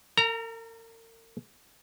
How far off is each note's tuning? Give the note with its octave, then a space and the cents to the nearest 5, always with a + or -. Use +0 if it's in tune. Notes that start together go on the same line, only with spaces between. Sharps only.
A#4 -40 A#5 +0